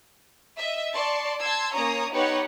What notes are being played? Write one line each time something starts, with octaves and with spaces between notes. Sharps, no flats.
D#5 E5
D5 A5 C6 C#6
A5 C6 E6 G#6
A#3 C#4 C#5 A#5 D#6
B3 D#4 G4 B4 C#5 F#5